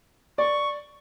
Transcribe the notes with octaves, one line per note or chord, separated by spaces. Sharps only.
D5 C#6